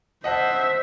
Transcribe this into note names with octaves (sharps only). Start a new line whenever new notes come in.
C5 D#5 E5 F#5 A5